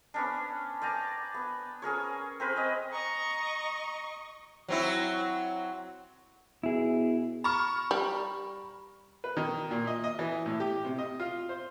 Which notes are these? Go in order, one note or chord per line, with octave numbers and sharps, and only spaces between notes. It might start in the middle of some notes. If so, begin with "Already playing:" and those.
B3 C#4 D4
D5 G5 G#5 A#5
B3
C#4 G#4 A#4 C#5
C4 A#4 B4
D#5 G#5
D#5 A#5 C#6
F#3 C4 E4
B2 E4 G#4
A#5 B5 C#6 F6
G3
B4
D#3
A#2
D#5
D#5
E3
A2
G4
C3
D#5
F4
C5